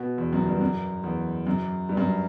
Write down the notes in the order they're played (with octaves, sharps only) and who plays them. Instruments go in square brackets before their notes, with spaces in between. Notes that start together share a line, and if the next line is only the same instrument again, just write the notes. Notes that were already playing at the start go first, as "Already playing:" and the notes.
Already playing: [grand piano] B2
E2
F#2
G2
F#2
E2
F#2
G2
F#2